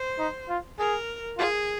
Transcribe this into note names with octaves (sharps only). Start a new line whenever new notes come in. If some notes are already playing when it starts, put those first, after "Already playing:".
Already playing: C5
D#4
F4
G#4 A#4
F4 G#4